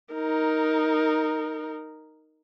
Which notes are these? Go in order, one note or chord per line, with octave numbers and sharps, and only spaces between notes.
D#4 A#4